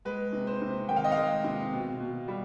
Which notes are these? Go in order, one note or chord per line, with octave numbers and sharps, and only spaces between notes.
G#3 B4
C3
C5
C3
D#3 G5
F5
D#5
F5
G#3
C3
B2
B2
G3